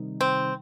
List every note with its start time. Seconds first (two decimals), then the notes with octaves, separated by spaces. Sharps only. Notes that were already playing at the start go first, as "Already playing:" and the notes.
Already playing: C3 D#3 G3 D#4
0.21 C4